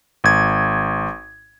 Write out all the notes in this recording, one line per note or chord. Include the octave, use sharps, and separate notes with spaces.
G#1 G#6